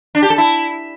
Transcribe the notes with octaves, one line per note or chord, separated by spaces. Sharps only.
D4
G4
A4
E4